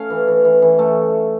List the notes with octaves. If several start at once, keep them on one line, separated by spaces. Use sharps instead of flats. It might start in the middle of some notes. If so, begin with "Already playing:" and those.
Already playing: A3 C#4 F5
E3
E3
E3
E3
A3